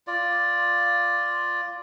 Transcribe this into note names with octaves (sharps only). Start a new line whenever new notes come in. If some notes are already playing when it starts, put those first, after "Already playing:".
F4 D5